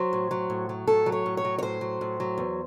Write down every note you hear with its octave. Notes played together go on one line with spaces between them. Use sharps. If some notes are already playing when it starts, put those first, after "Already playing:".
Already playing: F#3 C5
A2
F#3
A2
F#3
A2 A4
F#3
C#5
A2
C#5
F#3
C#5
A2 C5
F#3
A2
F#3
E2